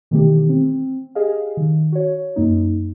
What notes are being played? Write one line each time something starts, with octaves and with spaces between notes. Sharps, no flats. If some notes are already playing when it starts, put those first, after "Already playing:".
B2 D#3 E3 A3 B3 G4
C4
G4 G#4 D#5 F5
D#3
F#4 C#5
F#2 A#3 D#4